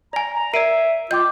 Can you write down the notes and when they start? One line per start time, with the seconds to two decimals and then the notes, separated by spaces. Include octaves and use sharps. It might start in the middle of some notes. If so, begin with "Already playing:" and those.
0.13 D5 G#5 A#5
0.36 A#5
0.54 A#4 D5 E5 C7 D7 D#7
1.11 F4 D#5 G5 D6 G6